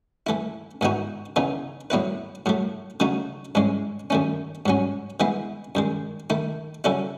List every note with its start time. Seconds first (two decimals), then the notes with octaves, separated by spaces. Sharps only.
0.27 E3 A3 E4
0.81 G#2 E3 B3 D#4 F#4
1.36 C#3 E3 B3 D#4
1.90 A2 F#3 B3 E4 B4
2.46 A2 F#3 A3
3.00 C#3 F#3 A3 D#4 F#4
3.55 G#2 E3 G#3 C#4
4.10 F#2 D#3 A3 C#4
4.66 G#2 F#3 C#4
5.20 E3 G#3 B3 E4
5.75 F#2 D#3 G#3
6.30 D#3 A3 E4
6.84 C#3 F#3 C#4 E4 A4